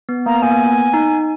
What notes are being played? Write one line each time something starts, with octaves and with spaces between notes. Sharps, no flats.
B3
A#3 A#5
B3
A#3 G#5
B3
D#4